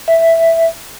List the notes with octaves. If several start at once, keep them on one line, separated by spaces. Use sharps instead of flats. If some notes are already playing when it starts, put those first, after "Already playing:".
E5